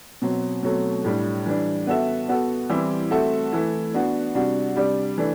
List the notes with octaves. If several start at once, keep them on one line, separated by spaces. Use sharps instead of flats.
B2 F#3 C4
B2 F#3 A3 C4
A2 G3 D4
E3 G3 D4
B3 F#4 A4 E5
B3 F#4 A4
E3 G3 C4 E4 G4
A3 C4 F#4 A4 E5
E3 A3 E4
B3 D4 F#4
C3 G3 D4 F#4
C3 G3 D4 G4 D5
E3 A3 D4